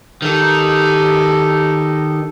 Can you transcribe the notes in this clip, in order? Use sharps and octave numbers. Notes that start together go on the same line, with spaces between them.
D#3 G4 A4